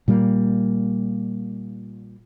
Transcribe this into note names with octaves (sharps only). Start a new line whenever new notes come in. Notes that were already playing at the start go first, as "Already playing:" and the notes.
A#2 G3 A#3